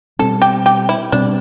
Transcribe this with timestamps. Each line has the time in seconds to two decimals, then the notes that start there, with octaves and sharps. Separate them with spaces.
0.19 B2 G3 C4 A4
0.42 G4
0.66 G4
0.89 E4
1.12 B2 G3 C4 D4